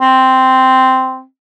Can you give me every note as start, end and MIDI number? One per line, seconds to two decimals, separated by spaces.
0.01 1.23 60